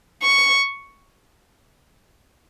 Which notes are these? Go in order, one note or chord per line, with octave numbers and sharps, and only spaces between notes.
C#6